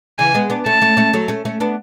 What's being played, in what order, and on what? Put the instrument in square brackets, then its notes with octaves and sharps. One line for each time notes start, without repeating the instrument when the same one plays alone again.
[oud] C#3 E3 [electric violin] G#5
[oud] G#3 B3
B3 D4
[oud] A3 C#4 [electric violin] A5
[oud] A3 C#4
A3 C#4
F#3 A3
A3 C#4
A3 C#4
B3 D4